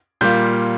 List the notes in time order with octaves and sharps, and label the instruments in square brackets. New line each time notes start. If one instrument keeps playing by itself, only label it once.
[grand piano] A#2 G3 A#3 F4 G6